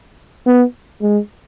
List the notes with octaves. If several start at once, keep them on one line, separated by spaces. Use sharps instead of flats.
B3
G#3